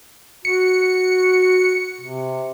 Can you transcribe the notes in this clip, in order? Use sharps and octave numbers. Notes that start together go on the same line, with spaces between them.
F#4 C#7
C3